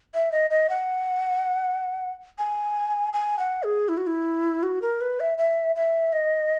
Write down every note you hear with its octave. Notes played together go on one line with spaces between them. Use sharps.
E5
D#5
D#5
F#5
G#5
G#5
F#5
G#4
E4
F#4
E4
F#4
A#4
B4
E5
E5
E5
D#5